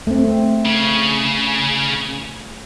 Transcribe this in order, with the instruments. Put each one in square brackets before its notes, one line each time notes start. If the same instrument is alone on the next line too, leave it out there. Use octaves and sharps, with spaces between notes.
[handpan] A3 C4
[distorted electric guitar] C#3